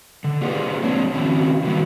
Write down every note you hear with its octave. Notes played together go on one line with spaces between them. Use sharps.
D3
A#3 D4 F4 G4 G#4 B4
F3 G#3 C4 D4 C5 C#5
D#3 F#3 C4 C#4 E4
D#3 F#3 G3 A#3 B3